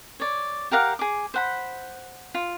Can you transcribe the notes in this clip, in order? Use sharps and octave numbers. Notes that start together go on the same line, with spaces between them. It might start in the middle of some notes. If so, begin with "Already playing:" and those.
C#5 D5
G4 A#4 F5 F#5
G#4 D6
C5 F#5 B5
F4